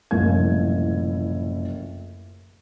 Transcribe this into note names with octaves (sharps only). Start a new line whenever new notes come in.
F#1 C2 A2 F3 E4 G#6